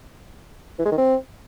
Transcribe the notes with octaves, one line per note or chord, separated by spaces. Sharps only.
E3
G#3
D#3
C4